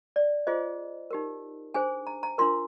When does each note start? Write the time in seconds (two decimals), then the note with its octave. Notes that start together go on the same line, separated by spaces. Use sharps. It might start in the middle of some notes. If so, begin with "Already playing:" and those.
0.16 D5
0.47 F4 G#4 C5 D#5
1.11 D#4 G4 A#4
1.74 D4 G#4 C5 G#5
2.07 A#5
2.23 A#5
2.38 D4 F4 A#4 C6